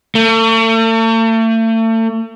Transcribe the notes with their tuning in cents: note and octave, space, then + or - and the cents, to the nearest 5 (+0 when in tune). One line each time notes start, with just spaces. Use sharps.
A3 +40